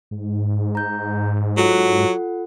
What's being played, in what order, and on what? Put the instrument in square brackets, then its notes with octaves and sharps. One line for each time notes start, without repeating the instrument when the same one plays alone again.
[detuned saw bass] G#2
[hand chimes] A#5 G6
[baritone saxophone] F#3 [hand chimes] F4 A4 F#5